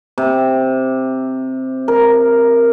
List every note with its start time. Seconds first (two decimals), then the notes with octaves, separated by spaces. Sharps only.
0.18 C3
1.88 A#4